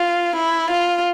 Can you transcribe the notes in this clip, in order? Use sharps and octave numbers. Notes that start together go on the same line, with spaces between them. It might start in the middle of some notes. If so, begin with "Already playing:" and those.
Already playing: F4
E4
F4